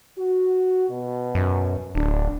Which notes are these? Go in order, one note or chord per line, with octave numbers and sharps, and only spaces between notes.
F#4
B2
F#2
D1 D4